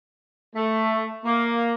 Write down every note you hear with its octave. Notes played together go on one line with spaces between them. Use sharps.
A3
A#3